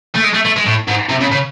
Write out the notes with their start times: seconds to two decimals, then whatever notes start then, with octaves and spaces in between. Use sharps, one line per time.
0.15 A3
0.24 G#3
0.34 A3
0.45 A3
0.57 G#3
0.66 A2
0.88 G#2
1.09 C3
1.21 C#3
1.32 C#3